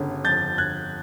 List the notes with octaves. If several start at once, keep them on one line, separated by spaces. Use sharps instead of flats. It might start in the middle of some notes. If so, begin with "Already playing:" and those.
Already playing: G1 C#3
F2 G6 A6
G1 F#6 G#6